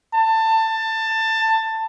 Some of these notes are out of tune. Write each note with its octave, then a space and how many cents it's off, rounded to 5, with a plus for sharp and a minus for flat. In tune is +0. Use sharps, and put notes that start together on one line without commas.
A5 +20